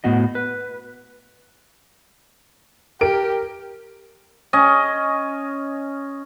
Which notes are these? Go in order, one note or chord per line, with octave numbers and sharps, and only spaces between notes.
A2 B3 F#4 D#5
B4
G4 A#4 D7
C#4 D#5